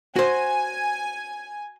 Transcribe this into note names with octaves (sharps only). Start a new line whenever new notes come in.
F#4 C5 G#5